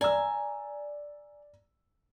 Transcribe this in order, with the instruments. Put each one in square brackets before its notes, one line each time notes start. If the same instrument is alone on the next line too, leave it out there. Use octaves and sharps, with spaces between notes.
[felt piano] D5 E6 [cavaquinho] G#5 A#5